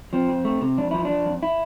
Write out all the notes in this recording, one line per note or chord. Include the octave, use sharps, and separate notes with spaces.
F3 C4
F2
A3
C3
F2 D4
F3 E4
F3 D4
F2
E4